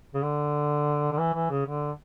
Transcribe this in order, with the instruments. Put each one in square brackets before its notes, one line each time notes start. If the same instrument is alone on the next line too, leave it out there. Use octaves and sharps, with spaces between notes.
[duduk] C#3
D3
D3
E3
E3
C#3
D3